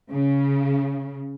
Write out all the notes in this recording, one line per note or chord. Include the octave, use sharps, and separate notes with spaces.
C#3